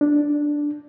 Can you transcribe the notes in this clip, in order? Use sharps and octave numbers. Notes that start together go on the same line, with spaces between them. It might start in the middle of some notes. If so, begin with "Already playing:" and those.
D4